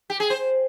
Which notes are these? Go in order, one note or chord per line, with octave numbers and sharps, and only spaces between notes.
G4
G#4
C5